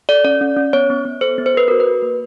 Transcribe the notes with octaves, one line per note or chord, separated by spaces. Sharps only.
A4 D5
C#4 D5
C#4
C#4
B3 C#5
B3
B3
A4 C5
B3
C5
A4 B4
F#4 A#4
B4
F#4
A#3